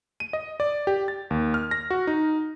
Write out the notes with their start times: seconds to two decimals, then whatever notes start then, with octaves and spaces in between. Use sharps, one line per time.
0.20 D#7
0.33 D#5
0.60 D5
0.87 G4
1.08 A6
1.31 D#2
1.54 F6
1.71 A#6
1.90 F#4
2.07 D#4